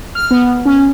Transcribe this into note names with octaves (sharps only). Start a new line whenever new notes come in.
F6
B3
C#4